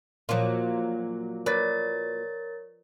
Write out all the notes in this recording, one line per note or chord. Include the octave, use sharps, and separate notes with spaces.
A#2 F3 F#3 F4
A#4 B4 C#5 D5 A6